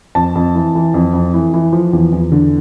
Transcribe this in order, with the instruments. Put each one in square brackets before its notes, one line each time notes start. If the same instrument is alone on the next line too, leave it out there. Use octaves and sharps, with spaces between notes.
[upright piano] F2 A5
F2
E3
E3
F2
F2
E3
E3
F3
E2
E2
D3